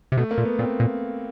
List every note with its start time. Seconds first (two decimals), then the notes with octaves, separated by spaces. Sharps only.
0.12 C3
0.17 B2 A3
0.31 A#3
0.38 A#2
0.45 B3
0.59 A#2 C4
0.80 A#2